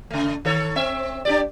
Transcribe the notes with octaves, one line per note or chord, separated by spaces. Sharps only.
C#3 A3
D#3 A4 C#5
C4 E5
D4 G4 D5